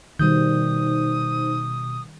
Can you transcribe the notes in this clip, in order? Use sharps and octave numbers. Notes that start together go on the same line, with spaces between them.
B2 D#3 G3 D#4 C5 D#6 G6